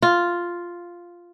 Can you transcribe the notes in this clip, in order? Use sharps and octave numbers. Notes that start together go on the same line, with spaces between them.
F4